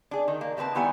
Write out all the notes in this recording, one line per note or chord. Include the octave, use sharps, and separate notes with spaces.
D4 G#4
D#3
A#3
C#3 A3 C4 B4 A5
D#3 G3 B3 E4 F#5 G#5